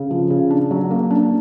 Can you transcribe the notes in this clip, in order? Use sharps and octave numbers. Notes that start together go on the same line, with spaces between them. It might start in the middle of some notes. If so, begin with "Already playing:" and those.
Already playing: C#3
F3
C#3
D4
F#3
A#3
D4